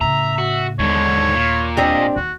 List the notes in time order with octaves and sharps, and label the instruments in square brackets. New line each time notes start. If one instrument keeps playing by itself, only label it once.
[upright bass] A2 C#3 [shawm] E5 [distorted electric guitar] A#5
[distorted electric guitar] F#4
[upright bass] D#2 [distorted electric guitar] G#2 D3 [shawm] C#5
[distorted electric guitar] A#2
[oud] C4 D4 G4 [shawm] D#5
[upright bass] D#2 [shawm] F#4